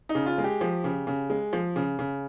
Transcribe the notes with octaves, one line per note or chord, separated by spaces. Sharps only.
D#4
C#3
F4
G#3
G4
F3
C#3
C#3
G#3
F3
C#3
C#3